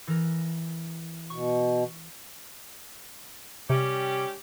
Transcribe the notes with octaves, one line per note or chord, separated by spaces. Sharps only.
E3 A#4
B2 C#6
C3 G3 C#4 G4